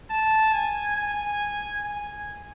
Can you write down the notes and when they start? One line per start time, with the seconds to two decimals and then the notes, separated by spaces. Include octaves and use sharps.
0.11 A5
0.53 G#5
0.96 G#5
1.84 G#5